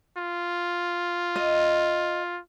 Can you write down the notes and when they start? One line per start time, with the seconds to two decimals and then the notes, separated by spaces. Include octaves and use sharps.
0.17 F4
1.36 D#5